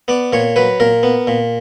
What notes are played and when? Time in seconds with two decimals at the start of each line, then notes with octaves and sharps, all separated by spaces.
0.08 B3 D5
0.33 A#2 C#5
0.56 F#3 B4
0.80 A#2 A#4
1.03 B3
1.27 A#2